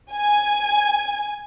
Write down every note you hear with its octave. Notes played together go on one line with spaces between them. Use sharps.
G#5